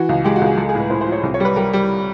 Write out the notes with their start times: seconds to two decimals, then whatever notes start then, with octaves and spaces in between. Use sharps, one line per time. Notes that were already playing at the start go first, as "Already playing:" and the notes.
Already playing: E3 F#4
0.09 C#2
0.24 G#3 G4
0.36 F#4
0.41 C#2 G#4
0.57 G#3 A4
0.69 G#4
0.75 A2
0.80 B4
0.90 A2 C5
1.01 C5
1.07 F3
1.12 C#5
1.23 C2
1.34 C#5
1.40 G3 B4
1.56 G3 A#4
1.73 G3